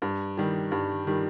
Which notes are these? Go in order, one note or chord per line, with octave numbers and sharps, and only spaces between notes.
G2
D#3 G3
G2
D#3 G3